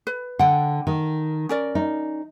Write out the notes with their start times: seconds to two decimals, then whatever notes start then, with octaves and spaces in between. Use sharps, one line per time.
0.07 B4
0.39 D3 F#5 G5
0.87 D#3
1.49 C#4 A#4 D5
1.75 D#4